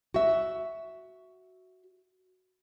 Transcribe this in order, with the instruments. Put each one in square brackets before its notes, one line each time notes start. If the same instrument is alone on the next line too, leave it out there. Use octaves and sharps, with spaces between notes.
[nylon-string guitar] F#4 E5